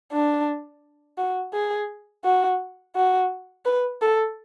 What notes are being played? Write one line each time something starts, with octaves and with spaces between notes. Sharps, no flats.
D4
F#4
G#4
F#4
F#4
B4
A4